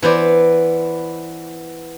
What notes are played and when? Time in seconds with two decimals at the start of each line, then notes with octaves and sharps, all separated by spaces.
0.02 E3 B3 C5 D5